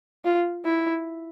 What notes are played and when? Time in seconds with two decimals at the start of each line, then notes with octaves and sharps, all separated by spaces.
0.25 F4
0.65 E4